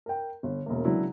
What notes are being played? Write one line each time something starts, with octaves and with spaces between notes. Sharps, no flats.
A#4 G5
G1
E1 A#3
C#3 E3 F#3 G#3 D4 E4